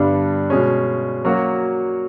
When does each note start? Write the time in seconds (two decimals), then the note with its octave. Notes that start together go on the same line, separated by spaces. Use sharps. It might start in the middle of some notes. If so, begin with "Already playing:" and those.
Already playing: G2 D3 G3 B3 D4
0.50 B2 G#3 C#4
1.25 F#3 A#3 C#4 F#4